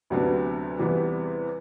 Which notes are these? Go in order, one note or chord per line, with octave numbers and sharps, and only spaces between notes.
D2 C3 F#3 B3 D4
E2 C3 E3 G3 B3